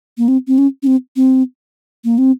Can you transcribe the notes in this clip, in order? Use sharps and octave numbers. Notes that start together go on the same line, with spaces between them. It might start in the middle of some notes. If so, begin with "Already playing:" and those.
A#3
C4
C4
C#4
C#4
C4
C4
A#3
C4